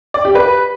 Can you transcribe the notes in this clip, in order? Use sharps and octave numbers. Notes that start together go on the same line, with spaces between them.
D5
G4
B4